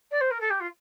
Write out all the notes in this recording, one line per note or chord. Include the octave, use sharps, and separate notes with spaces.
D5
C5
A#4
A4
G4
F4